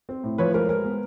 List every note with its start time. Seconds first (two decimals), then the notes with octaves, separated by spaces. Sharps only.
0.09 C4
0.24 A2
0.38 F3 B4 C#5
0.54 G#3 A#4 C5
0.69 G#3 A#4
0.84 B3